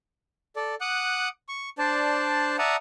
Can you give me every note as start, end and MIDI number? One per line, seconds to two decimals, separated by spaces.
0.56 0.75 69
0.56 0.75 74
0.81 1.29 78
0.81 1.29 86
0.81 1.29 87
0.81 1.29 90
1.49 1.70 85
1.78 2.57 62
1.78 2.57 72
1.78 2.57 74
1.78 2.57 81
2.58 2.76 74
2.58 2.76 76
2.58 2.76 78
2.58 2.76 81
2.58 2.76 82
2.58 2.76 87